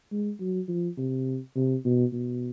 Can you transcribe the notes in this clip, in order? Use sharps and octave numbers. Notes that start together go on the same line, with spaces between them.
G#3
F#3
F3
C3
C3
B2
B2